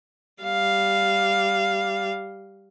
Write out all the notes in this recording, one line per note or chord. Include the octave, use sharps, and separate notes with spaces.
G3 F5